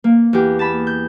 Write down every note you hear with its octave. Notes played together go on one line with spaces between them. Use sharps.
A#3
E2 G4
A5 B5
G6